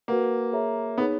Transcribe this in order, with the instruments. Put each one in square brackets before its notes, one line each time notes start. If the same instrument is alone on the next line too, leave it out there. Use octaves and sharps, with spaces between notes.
[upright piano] A#3 [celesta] F#4 B4 F#5
[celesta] G#4 C#5 E5 A#5
[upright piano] B3 [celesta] D#4 G#4 C#5